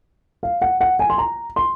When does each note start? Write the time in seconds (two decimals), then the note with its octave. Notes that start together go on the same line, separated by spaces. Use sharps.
0.43 F5
0.62 F#5
0.81 F#5
0.99 G#5
1.10 C6
1.18 A#5
1.56 C6